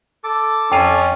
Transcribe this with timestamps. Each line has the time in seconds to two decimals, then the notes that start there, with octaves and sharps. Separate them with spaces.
0.24 A4 D6
0.72 F2 C#4 F4 G5 A5